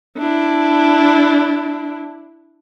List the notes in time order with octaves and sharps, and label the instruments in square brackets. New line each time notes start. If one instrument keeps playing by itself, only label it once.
[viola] D4 E4